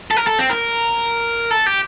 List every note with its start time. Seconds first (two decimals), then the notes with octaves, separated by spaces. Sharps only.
0.11 A4
0.17 A#4
0.27 A4
0.39 C4
0.50 A#4
1.51 A4
1.66 G4